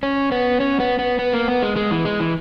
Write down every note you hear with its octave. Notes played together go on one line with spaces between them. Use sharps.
C#4
B3
C#4
B3
B3
B3
A#3
B3
G#3
G#3
E3
G#3
E3